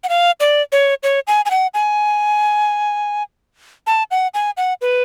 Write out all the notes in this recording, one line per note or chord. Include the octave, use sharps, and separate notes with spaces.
F#5
F5
D5
C#5
C#5
G#5
G#5
F#5
G#5
A5
F#5
G#5
F#5
B4